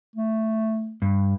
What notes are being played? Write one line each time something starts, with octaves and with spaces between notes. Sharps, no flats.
A3
G2